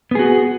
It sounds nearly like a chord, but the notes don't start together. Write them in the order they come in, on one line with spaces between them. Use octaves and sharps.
B3 G#4 F#4